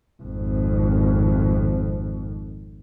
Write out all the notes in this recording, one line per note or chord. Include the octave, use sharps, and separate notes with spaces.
G#1 F2